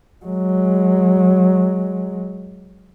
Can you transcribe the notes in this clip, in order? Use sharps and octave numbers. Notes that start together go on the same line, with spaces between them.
F#3 G#3